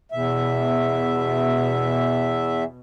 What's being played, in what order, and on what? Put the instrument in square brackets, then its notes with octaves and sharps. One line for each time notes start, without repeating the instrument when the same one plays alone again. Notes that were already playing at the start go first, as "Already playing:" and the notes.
[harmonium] E2 E5 [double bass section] B2